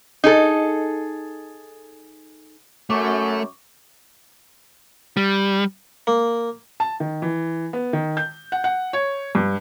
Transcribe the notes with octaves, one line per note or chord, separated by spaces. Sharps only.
D#4 G#4 A4
F#2 A3 C#6 D6
G3
A#3
A5
D#3
E3
B3
D#3
G6
F#5
F#5
C#5
G2